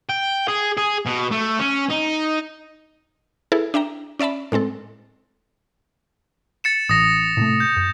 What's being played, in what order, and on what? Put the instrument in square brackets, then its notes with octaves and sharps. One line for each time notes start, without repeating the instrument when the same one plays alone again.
[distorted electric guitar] G5
G#4
G#4
B2
A3
C#4
D#4
[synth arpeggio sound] E4 G#4 A4 B4
D4 E5 G5 A#5
C#4 D5 E5 A5 B5
A2 G#3 C4 A4
[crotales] A6 C#7 E7
[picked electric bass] A1 [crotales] D#6 A#6 E7
[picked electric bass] A2 C3 A3
[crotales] G6
[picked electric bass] F#2